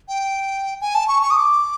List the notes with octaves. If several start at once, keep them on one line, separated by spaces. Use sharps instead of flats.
G5
G#5
A5
C#6
C#6
D#6
D6